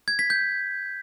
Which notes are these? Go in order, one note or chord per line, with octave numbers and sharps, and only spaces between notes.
G#6
B6
G6